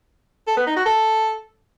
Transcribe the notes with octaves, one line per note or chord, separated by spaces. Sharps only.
A4
B3
D#4
F#4
A4